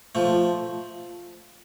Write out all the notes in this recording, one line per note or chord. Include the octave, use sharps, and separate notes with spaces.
F3 A3